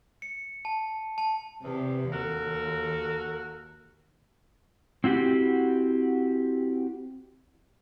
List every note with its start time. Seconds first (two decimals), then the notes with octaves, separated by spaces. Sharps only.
0.22 C#7
0.65 A5
1.18 A5
1.64 E2 C3
2.12 D#2 F#4 A4 A#4
5.04 C4 E4 F#4 G4